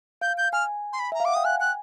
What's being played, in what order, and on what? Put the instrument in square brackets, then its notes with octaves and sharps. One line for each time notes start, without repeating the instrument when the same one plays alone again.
[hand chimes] F5 [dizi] G6
[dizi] G6
[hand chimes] G#5 [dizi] F6
[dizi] C6
B5
[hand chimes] E5 [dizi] A#5
[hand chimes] F5
[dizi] D6
[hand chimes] F#5
[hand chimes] G5 [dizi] D#6
[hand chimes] G#5 [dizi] F#6
[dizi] F#6